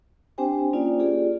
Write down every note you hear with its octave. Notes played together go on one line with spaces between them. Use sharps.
C4 D4 G4 C5 G5 G#5
A#3 C#4 D#4 F4 D5
F4 G4 G#4 D5